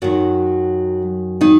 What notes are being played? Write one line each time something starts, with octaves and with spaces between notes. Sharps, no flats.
F#2 D#3 F#3 F#4
D#3 D#4